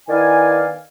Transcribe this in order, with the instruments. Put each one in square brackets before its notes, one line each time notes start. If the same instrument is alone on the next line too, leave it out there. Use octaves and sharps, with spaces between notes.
[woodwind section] D#3 B3 E4 D5 F5 G#5